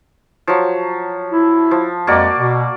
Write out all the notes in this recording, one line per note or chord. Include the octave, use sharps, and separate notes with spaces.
F3 F#3
E4
F3
F2 G#3 A#3 F#4 D5
B2